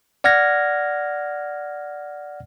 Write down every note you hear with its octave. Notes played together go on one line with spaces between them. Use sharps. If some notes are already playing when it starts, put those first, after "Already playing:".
D5 F#5 F6 G#6 A#6